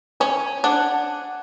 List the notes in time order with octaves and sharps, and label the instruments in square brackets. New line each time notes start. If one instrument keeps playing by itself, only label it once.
[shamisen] C#4 [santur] G#5
[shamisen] D4 [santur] F#5